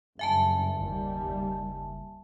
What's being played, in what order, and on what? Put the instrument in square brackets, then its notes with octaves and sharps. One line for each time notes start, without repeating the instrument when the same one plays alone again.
[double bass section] F#1 G2 [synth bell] E5 G#5 A5
[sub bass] F#1 [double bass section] D#2 G3
[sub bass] F#1